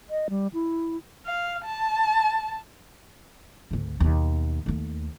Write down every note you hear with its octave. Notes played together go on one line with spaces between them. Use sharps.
D#5
G3
E4
F5
A5
G#1 D2
D#2 B2
D#2 A3